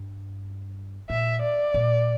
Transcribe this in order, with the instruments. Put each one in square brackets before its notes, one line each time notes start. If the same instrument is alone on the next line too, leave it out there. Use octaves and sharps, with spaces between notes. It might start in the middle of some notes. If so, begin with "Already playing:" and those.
Already playing: [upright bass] G2
[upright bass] A#2 [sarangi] E5
[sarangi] D5
[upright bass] A#2